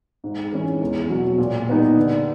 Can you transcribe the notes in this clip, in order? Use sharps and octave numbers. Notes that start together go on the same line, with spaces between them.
G#2
E3 G#3 C#4
E2
B2 F#3
A#2
G3 B3 D#4
D3